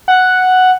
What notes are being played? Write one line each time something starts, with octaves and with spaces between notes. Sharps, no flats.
F#5